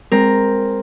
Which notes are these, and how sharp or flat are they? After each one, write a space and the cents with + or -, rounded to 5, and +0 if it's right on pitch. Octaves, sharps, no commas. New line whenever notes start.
G#3 -20 C4 +0 A#4 +0